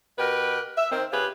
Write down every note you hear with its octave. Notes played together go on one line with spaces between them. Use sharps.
B2 G4 A#4 B4
E5
D#3 C4
C#3 F4 G4 G#4 B4